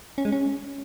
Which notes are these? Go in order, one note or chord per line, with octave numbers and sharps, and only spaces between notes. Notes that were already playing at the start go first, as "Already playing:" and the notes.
C#4
G#3
C#4